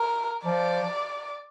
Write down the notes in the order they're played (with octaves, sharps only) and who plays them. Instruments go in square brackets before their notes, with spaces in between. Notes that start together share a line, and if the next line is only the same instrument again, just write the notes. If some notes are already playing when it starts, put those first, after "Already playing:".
Already playing: [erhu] A#4
[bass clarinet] F3 [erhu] D5